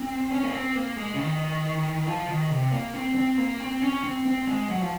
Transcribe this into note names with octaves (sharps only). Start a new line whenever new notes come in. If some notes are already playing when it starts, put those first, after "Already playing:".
Already playing: C4
C#4
A#3
C4
A#3
G#3
C#3
D#3
F3
D#3
C3
A#3
C4
C4
A#3
C4
C#4
C4
C4
G#3
F#3
F3